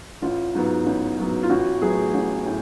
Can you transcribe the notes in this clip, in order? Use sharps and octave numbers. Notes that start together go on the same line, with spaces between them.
A1 F4
G#2 F#3 B3
A1
G#2 F#3 B3
F4
A1 F#4
A2 F#3 B3 G#4
A1
A2